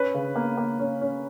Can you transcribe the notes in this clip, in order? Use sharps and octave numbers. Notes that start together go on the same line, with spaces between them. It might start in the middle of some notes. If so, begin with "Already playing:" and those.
Already playing: C#4 B4
C#3
A#3
A#3
C#4
C#4